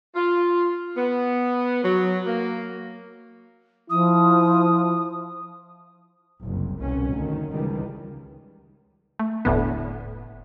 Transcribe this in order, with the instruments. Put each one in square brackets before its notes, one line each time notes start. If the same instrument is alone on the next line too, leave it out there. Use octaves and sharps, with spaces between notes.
[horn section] F4
B3
F#3
A#3
[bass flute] F3 [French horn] E4 [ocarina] D#6
[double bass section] F#1 C2
C2 B2 C#4
D2 D#3
C#2 D#3 E3 G3
[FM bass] A3
[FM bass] F1 [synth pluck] D2 A2 B3